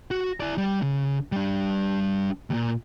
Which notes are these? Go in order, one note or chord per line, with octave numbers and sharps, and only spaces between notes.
F#4
E4 D5
G3
C#3 C#4
G3 D4
D#2 A#2